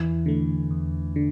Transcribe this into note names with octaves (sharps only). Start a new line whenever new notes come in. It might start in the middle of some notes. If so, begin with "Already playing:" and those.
Already playing: E2 E3
D3 A3
E2
D3